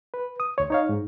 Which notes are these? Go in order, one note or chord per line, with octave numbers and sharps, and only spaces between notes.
B4
D#6
D2 C#5
D#4 C#5 F5
G#2